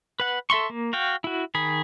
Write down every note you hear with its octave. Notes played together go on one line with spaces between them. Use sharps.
B4 F#5
A4 E5 C6 C#6
A#3
F#4 F5 G5
E4 F#4
D#3 G#4 B5